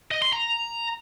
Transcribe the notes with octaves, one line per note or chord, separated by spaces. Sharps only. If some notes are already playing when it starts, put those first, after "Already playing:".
D#5
C6
A#5